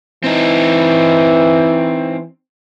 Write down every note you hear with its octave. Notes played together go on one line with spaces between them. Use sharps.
E3 C4 D#4